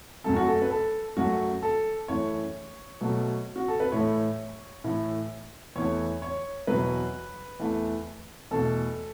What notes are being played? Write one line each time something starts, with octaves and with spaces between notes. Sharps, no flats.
F#2 F#3 A3 A4
F#4
A4
B4
A4
F#2 F#3 A3 F#4
A4
F#2 E3 A3 C#5
B2 F#3 A3
F#4
A4
B4
A2 E3 A3 C#5
A2 E3 A3
E2 E3 A3 C#5
C#5
E2 B2 F#3 B4
E2 E3 A3
E2 B2 A3 A4